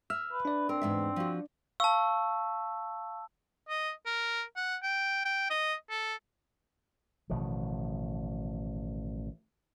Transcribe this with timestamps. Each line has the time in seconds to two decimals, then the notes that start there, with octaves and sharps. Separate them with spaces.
0.10 E5 E6 F6
0.32 B4
0.45 D4 D5
0.69 C4 A#4
0.82 E2 G#2 E5
1.16 F3 F#4
1.80 F5 A5 C#6 E6
3.69 D#5
4.06 A#4
4.56 F#5
4.83 G5
5.25 G5
5.50 D#5
5.90 A4
7.30 A1 B2 D#3 F3